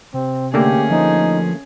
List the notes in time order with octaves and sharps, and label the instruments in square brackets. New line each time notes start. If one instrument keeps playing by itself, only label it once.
[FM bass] C3 [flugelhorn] C4
[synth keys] D3 A3 A#3 [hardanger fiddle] C#4 G#4 [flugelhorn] G4
[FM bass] F3 [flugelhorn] D#4